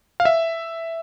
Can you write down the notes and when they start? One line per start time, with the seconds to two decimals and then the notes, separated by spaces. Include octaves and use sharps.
0.20 F5
0.25 E5